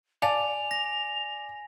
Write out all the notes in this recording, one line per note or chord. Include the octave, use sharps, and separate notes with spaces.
D5 F5 G#5 A5 F7
A#6